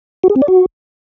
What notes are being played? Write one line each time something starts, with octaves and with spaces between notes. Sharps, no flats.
F#4
G#4
C4
D5
F#4